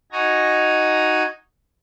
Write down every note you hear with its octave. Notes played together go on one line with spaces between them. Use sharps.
D#4 F#4 G#5 A#5